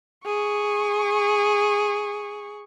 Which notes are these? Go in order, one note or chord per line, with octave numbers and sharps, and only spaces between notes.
G#4 C#6